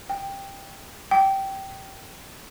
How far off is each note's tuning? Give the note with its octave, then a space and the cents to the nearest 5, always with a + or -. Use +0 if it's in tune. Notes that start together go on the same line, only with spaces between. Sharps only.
G5 +10
G5 -15